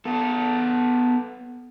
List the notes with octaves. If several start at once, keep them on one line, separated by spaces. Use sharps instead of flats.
B3 A4